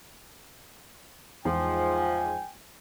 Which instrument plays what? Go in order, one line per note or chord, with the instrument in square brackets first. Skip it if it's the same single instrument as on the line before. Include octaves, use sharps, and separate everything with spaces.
[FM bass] E2 [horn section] G#2 F3 [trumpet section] G5 G#5